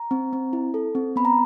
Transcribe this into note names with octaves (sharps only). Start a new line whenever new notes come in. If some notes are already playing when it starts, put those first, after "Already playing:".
Already playing: A#5
C4
C4
E4
A4
C4
B3 B5
A#5